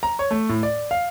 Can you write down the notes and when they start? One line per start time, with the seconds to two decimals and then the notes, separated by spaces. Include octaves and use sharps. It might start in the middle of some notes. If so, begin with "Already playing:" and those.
0.03 A#5
0.19 C#5
0.31 A3
0.49 A2
0.63 D5
0.91 F5